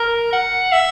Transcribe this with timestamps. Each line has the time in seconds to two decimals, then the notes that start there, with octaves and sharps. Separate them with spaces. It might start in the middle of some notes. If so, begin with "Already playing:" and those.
Already playing: A#4
0.32 F#5
0.72 E5